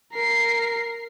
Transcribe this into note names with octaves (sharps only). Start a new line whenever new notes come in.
A#4 C7